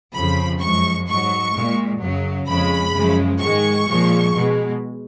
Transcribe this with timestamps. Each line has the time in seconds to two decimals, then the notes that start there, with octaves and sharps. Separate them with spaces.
0.15 F2 C#3 F3 B5
0.62 F#2 F3 G#3 C#6
1.08 G#2 F#3 C#6
1.55 A#2 G#3
2.01 F#2 C#3 F#3
2.47 F2 C#3 G#3 B5
2.94 F#2 C#3 F3 G#3
3.40 G#2 D#3 G#3 C#6
3.87 A#2 F3 G#3
4.35 B2 G#3